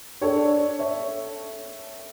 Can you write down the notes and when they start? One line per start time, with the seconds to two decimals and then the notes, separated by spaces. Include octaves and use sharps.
0.22 D4 A4 C#5
0.79 C#5 E5